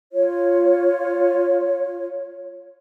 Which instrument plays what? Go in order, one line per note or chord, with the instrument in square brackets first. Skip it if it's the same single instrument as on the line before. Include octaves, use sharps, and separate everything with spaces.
[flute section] F4 C#5